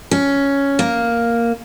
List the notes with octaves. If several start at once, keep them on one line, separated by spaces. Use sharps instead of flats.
C#4
A#3